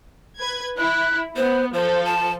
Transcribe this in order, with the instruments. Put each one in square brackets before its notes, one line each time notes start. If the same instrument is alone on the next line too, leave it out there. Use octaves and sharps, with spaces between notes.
[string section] B4 G#6
[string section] E4 [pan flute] F#6
[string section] B3 [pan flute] C5
[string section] F3 A4 [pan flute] C5
[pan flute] A5